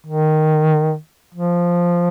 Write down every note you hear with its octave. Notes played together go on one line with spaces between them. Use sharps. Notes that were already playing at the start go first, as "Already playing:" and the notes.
D#3
F3